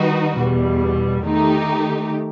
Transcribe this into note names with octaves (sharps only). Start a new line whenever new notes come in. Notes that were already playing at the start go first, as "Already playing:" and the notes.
Already playing: D#3 G3 D#4 F#4 B4
E2 B2 G3
D#3 A3 D#4 G4